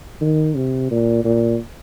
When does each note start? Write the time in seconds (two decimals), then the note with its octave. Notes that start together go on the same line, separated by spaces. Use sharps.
0.21 D#3
0.56 C3
0.91 A#2
1.25 A#2